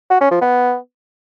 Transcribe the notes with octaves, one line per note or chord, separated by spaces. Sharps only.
F#4
C#4
F3
B3